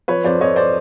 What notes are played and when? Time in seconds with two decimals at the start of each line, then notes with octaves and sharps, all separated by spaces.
0.08 F3 B4 C#5
0.24 F2 C5 D5
0.41 F2 C#5 D#5
0.56 C5 D5